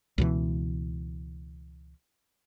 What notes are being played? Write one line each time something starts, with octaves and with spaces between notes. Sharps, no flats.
C#2 B2 E3